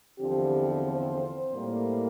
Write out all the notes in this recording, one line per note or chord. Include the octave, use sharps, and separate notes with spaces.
E2 D3 F3 C4 G4
C5
A2 G3 A#3